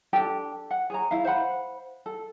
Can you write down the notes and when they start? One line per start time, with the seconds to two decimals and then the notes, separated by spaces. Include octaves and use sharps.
0.13 D4 G4 A4 G5
0.71 F#5
0.90 G#4 C#5 A#5
1.11 E4 F5
1.25 C5 F5 F#5 B5
2.06 A4